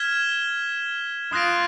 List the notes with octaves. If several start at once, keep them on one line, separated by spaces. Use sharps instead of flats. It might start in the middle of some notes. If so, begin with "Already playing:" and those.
Already playing: F6 G#6 B6 E7 G7
F4 D#6 F#6 A#6 D7